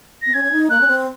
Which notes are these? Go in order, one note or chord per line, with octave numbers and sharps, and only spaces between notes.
C4 A#6
C#4 G#6
C#4
D#4
A#3 F#6
C#4
C4